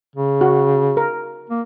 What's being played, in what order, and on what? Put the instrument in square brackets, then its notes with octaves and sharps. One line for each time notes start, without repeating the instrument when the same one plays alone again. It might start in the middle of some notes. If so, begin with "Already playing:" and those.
[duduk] C#3
[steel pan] F#4
A#4
[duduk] A#3